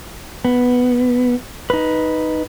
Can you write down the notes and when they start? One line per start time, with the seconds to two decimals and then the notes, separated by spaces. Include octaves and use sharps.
0.45 B3
1.70 D#4 B4